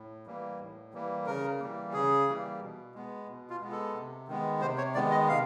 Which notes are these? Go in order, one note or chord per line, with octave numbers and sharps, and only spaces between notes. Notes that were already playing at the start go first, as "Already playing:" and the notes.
Already playing: A2
E3 G3 A#3
A2
E3 G3 A#3
C#3 A#4
E3 G3 A#3
C#3 G#4
E3 G3 A#3
B2
G#3 B3
B2
F4
G#3 B3
A4
C3
D#3 G#3 B3
C3 C5
C#5
D#3 G#3 B3 D5
D#5
C3 F5